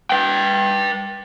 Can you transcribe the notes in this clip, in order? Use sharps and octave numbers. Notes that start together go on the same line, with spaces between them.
B4 G5